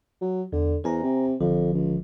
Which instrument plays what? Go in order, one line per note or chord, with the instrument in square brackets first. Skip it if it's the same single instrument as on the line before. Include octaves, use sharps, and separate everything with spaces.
[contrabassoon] F#3
[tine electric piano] E2 [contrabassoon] D3
[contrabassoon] E2 [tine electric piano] C5 G#5 A#5
[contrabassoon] C3
[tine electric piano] G1 D3 F3 [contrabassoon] F2
[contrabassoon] C#2